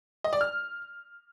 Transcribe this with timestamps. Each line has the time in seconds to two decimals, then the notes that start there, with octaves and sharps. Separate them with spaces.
0.24 D#5
0.33 D5
0.41 F6